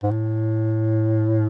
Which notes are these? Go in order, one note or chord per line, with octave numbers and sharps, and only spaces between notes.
G#2
A2